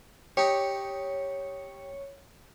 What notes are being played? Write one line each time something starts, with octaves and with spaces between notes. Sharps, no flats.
D#4 G4 C#5